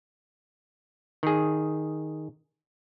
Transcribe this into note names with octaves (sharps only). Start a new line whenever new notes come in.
D#3 G#4